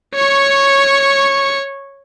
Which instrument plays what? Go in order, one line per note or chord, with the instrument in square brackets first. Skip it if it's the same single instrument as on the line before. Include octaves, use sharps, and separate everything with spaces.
[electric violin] C#5 C#6